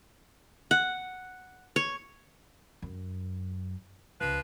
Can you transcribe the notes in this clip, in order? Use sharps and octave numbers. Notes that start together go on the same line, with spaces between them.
F#5
C#5
F#2
C#2 F3 B4